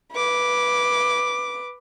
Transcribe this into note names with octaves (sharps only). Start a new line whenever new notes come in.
B4 D6